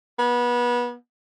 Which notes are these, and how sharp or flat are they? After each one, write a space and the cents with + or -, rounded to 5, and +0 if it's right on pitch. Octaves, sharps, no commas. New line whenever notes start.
B3 -25